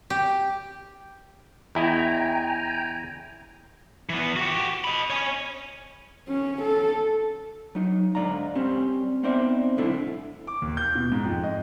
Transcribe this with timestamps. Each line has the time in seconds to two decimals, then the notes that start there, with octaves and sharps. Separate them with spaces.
0.10 G4
1.75 E2 E4 D#5 G5 G#5 A#5
4.09 E3 B3
4.36 F#4 G4
4.84 D#5 B5
5.10 C#5 G#5
6.28 C#4
6.62 A4
7.75 F#3 D#4
8.15 G#2 D3 F3 D5 F5 A#5
8.55 G3 C4 C#4
9.23 B3 C4 D#4 C5 D5 E5
9.77 B1 G#2 D3 E4 A4
10.47 D6
10.62 D#2
10.77 G6
10.95 B2
11.12 G#2
11.25 F2
11.44 D#5